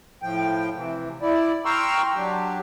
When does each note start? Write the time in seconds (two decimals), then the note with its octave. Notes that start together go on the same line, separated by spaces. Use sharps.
0.22 A2 F3 G5
0.75 C3 E3
1.22 E4 D5
1.65 G5 A#5 C6 C#6 E6 F6
2.16 F#3 D4 G4